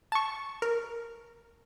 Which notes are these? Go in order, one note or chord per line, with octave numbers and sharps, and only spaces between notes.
A5 C#6
A#4